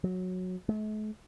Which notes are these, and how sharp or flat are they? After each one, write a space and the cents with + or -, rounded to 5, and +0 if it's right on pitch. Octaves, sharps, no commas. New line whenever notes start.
F#3 -10
A3 -45